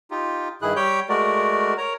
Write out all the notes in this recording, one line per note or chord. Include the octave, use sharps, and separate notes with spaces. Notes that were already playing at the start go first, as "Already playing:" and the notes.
D#4 F4 G4
G2 D#3 E4 G#4 F#6
G3 G4 C#5 G5 G6
G#3 A3 F#4 A#4 D5
A#4 C#5 A#5